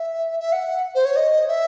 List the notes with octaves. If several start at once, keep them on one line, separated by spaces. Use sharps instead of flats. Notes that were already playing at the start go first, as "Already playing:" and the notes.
Already playing: E5
E5
F#5
C5
C#5
D#5
E5